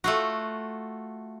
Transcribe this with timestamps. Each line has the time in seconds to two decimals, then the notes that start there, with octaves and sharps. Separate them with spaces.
0.04 A3 F4 F#4